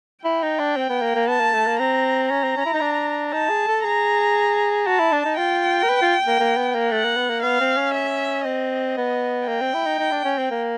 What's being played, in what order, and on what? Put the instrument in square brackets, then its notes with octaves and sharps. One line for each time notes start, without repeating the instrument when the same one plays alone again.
[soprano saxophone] E4 [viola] G5
[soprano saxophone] D#4
D4
C4
B3
A#3
A#3
[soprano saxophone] B3 [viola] A5
[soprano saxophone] A#3
A3
A#3
[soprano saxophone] C4 [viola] A#5
[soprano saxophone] C#4 [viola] A#5
[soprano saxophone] C4
C#4
E4
D#4
D4
[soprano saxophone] D#4 [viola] A5
[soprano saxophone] G#4
A4
[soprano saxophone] G#4 [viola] A#5
[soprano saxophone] F#4 [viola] A5
[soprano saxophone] E4
D4
D#4
[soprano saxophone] F4 [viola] G5
[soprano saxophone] A#4
B4
F4
A#3
A#3
B3
A#3
[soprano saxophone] A3 [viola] F#5
[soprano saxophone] A#3
B3
A#3
[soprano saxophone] B3 [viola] F5
[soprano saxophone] C4
C#4
[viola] E5
[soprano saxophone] C4 [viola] D#5
[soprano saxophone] B3
[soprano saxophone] A#3 [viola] G5
[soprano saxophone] C4
E4
D#4
D#4
D4
C#4
C4
A#3